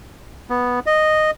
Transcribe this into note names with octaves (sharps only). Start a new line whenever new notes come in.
B3
D#5